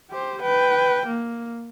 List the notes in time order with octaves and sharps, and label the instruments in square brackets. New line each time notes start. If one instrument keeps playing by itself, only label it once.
[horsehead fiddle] G4 C5
B4 G5
A#3